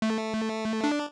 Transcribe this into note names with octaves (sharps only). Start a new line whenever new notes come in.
A3
D4